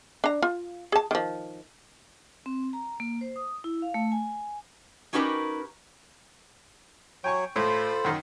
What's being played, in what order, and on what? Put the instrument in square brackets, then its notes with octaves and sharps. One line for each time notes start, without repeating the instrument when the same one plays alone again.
[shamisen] D4 A#5
F4
G#4 A5
D#3 F3
[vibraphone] C4
A#5
A#3
C5
D#6
E4
F5
A3
G#5
[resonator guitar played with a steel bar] C#4 D#4 F#4 G4 A#4 B4
[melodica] F#3 C#5 [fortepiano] G5 G#5 C#6
[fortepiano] A2 [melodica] F4 C5 B5 [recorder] A4
[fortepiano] F#2 D#3